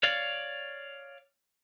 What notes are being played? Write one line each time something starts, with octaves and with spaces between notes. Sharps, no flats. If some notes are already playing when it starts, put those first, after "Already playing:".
C#5 D5 F5